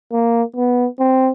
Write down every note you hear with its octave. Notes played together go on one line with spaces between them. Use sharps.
A#3
B3
C4